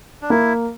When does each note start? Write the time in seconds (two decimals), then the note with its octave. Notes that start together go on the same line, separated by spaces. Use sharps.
0.22 D4
0.30 A#3 E4